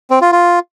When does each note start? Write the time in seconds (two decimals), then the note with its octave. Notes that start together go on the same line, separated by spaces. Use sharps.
0.10 C4
0.21 F4
0.32 F4